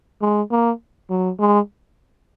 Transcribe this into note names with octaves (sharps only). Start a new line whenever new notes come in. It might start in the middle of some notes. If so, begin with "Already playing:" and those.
G#3
A#3
F#3
G#3